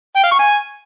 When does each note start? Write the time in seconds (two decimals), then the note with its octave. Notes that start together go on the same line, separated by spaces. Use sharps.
0.16 G5
0.23 F5
0.31 C#6
0.39 G#5